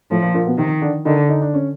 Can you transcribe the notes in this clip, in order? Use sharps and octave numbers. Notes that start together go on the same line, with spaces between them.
A2 F3 A3
A#2 A#3
A#2 A#3
B2 B3
C3 D#3 C4
D3 D4
D3 D#3 D#4
D#4
D4
C#4